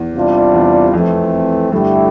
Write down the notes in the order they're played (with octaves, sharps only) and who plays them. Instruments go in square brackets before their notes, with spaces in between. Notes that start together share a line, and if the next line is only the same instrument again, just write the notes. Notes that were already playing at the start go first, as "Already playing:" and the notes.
Already playing: [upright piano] E2
[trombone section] C3 G3 D4 F4
[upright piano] E2
[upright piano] F2 [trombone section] E3 A3 C4
[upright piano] G2 [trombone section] D3 A3 E4 G4